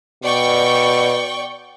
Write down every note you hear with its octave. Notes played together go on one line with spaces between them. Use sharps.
B2 D5 G5 C#6